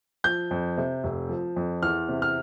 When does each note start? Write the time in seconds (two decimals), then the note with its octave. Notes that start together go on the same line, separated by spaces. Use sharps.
0.24 F3 G6
0.51 F2
0.77 C3
1.04 F1
1.29 F3
1.56 F2
1.83 E2 F6
2.09 C3
2.22 F6